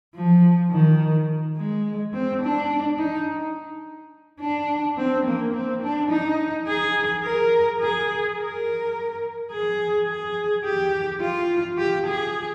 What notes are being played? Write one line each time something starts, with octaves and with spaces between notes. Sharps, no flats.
F3
D#3
G#3
C4
D4
D#4
D4
C4
A#3
C4
D4
D#4
G#4
A#4
G#4
A#4
G#4
G#4
G4
F4
G4
G#4